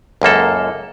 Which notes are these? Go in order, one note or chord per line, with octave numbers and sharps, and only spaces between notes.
C#2 F#2 A#3 A4